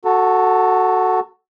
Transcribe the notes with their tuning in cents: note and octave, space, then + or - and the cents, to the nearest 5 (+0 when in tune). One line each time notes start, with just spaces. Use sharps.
F#4 +0 A4 +0 A5 +45